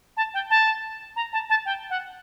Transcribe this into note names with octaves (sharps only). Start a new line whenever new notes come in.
A5
G5
A5
A#5
A5
A5
G5
F#5